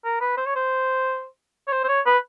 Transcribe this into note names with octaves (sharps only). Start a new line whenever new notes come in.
A#4
B4
C5
C#5
C5
C#5
C5
C5
C#5
B4